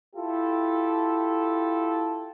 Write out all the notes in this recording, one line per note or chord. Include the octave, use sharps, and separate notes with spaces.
E4 F4 G4 A4